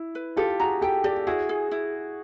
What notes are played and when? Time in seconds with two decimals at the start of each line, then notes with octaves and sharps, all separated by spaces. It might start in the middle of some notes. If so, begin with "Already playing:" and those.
Already playing: E4
0.15 B4
0.36 F4 G4 A4
0.60 F#4 G#4 A#5
0.81 G4 A4 G5
1.04 G4 A4 D5
1.27 E4 F#4 G#4
1.49 G#4
1.71 E4